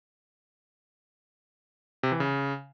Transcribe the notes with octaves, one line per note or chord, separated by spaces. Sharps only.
C3
E3
C#3